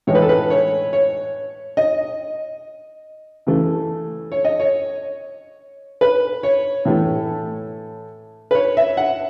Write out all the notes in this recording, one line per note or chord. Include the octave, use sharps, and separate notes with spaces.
A2 E3 G#3 C#5
B4
A4
B4
C#5
C#5
D#5
C#3 E3 A3
C#5
D#5
C#5
B4
C#5
A2 E3 A3
B4
C#5
E5
F#5